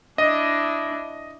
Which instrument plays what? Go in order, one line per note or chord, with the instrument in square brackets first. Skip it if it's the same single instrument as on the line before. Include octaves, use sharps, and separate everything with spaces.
[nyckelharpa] D4 E4 [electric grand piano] D#5